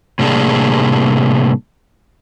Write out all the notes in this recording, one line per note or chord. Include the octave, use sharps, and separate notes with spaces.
A2 C3 G3 A#3 D4 G#4